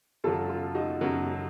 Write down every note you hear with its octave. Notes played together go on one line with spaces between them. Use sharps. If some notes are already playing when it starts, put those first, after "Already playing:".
F#2 C#3 F#3 F4 A4
F4
D#4 F#4
F#2 C#3 F#3